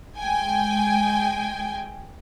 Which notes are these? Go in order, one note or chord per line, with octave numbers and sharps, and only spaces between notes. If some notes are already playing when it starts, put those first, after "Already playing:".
G#3 G5 G#5